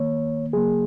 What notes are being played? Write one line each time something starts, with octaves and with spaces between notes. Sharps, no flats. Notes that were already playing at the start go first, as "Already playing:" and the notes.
Already playing: D#3 A#3 C#5
C#3 F#3 A#3 G#4